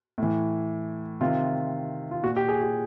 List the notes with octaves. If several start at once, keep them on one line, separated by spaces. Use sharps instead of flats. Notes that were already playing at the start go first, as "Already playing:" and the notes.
A2 E3
C3 D#3 F4
F4
A#2 F#4
G4
G#4
G4